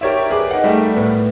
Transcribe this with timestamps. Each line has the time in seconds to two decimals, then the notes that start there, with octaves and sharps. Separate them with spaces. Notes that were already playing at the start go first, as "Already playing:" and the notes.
0.01 G4 A#4 C#5 D5 E5
0.31 G#4 B4 D6
0.51 D#4 F#5
0.64 G3 A3 A#4 E5 G5
0.96 A2 B3